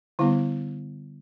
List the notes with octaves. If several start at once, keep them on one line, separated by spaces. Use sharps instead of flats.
D3 G3 B3 E4